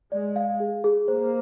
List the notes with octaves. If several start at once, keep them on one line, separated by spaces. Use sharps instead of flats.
G#3 D5
F5
G#4
G#4
A#3 C5